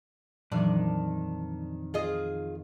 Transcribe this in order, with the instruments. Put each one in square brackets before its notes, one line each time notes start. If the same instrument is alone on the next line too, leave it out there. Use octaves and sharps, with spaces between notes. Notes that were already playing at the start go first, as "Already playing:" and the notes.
[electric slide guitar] F2 D#3 [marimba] A#2 E3 F#3 [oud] D4
[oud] F4 G#4 D#5